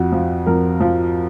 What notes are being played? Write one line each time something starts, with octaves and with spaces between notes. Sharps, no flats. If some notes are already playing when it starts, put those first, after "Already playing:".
Already playing: F2 F#4
F3
F2 A#4
F3